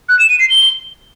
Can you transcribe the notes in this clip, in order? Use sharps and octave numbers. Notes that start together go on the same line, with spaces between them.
F#6
E7
D#7
C7
G7